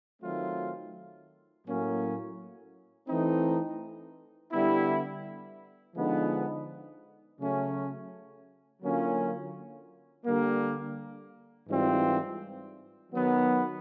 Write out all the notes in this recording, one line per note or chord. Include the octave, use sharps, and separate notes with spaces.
D#3 F#3 A3 C4 F4
A2 F#3 A#3 C#4
E3 A3 C4 D#4
D3 G3 B3 E4
D3 F3 G#3 B3 D#4
C#3 F#3 A3 C#4
D3 F#3 A#3 C#4 F4
D3 G3 A#3
G#2 E3 G3 C4 F4
D#3 F#3 B3